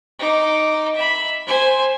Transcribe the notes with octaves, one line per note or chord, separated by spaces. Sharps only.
D#4 D6
E5 B5
C5 G#5